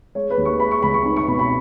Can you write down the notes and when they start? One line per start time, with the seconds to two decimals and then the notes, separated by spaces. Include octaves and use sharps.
0.15 G#3 C#5
0.30 B4
0.37 D#2
0.45 C#6
0.60 G#3 B5
0.71 C#6
0.83 C#2 B5
0.94 C#6
1.05 D#4
1.17 C#6
1.28 B2 B5
1.39 B5